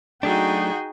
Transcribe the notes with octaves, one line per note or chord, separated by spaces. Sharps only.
F#3 A3 D4 D#4 F#4 G#4 G5